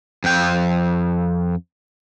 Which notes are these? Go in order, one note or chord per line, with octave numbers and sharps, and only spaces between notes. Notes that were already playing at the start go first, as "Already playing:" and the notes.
F2 G5